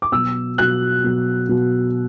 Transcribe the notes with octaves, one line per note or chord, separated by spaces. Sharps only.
D6
B2 F#3 E6
B2 F#3 F#6
B2 F#3
B2 F#3